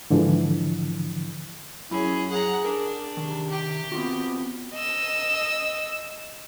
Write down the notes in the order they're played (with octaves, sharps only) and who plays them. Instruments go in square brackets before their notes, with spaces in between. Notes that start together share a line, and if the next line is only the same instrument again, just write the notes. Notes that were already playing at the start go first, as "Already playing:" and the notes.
[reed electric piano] G#2 D3 E3 F3
[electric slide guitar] F#2 [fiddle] C#4 G#4 [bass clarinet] E4
[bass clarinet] G#4 [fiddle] F#5 A#5
[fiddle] D4 [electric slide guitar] A#4
[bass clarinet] C3 [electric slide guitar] D#3
[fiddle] G4 G5
[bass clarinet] B3 [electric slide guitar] C4 F4 F#4
[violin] D#5 E6